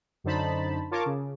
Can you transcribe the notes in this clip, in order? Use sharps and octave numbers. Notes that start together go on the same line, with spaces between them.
F#2 D3 D#4 C5 A5 B5
F4 A#4 C#5 A5 D6
C#3